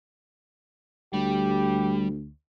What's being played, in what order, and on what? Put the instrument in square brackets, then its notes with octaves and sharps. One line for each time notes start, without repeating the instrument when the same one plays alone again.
[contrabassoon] D2 [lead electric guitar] G3 [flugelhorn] G4